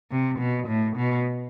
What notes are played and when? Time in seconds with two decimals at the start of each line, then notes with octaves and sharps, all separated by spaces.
0.11 C3
0.39 B2
0.68 A2
0.97 B2